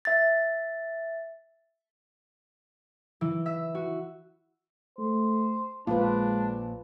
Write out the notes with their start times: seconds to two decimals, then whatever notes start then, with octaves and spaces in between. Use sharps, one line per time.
0.05 E5 A6
3.21 E3
3.46 E5
3.75 F#4
4.98 A3 C5
5.87 A#1 G#3 A#3 D4 F4 B4